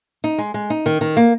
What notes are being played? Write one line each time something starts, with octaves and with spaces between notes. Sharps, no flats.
D#4
G#3
G#3
D#4
D#3
D#3
A#3